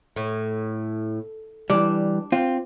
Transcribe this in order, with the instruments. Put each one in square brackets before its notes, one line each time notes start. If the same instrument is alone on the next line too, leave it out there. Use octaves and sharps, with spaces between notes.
[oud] A2
[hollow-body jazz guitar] E3 G3 [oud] D4
[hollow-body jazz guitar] C4 F4